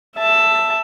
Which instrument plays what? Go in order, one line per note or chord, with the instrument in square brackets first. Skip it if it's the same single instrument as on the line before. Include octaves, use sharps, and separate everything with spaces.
[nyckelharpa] E5 A5